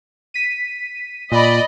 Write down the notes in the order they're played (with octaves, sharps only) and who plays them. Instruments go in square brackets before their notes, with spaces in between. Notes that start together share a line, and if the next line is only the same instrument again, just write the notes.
[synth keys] B6 D#7
[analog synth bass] A#2 [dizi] D5 [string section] D#5 B5